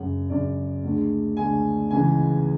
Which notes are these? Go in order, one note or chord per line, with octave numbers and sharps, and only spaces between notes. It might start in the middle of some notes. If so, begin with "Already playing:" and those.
Already playing: F#2 C#3 G#3 F#5
F#2 C#3 G#3 D5
D2 D3 G#3
D2 D3 G#3 G#5
C#2 C#3 E3 G#3 G#5